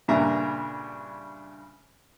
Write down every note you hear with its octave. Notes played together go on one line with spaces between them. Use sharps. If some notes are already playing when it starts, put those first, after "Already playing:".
G2 A#2 C#3 D4 E5 A#5